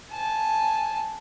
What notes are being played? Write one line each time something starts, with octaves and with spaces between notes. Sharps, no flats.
G#5 A5